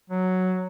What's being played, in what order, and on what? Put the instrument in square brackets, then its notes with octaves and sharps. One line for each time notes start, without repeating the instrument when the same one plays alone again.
[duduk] F#3